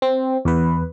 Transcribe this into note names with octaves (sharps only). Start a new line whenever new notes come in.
C4
E2 B4